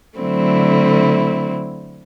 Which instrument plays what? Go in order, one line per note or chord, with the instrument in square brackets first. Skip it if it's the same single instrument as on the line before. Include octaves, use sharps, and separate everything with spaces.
[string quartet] D3 F#3 A3 C4 E4